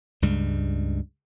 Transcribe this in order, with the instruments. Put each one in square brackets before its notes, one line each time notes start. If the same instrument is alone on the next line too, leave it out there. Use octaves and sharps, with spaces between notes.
[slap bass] C#2 G2 G3 G#3